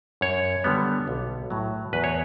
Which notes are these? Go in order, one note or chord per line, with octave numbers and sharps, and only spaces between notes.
F#2 C#5
D3 G3 B3
B1
A2 F#3
E2 B4
C#5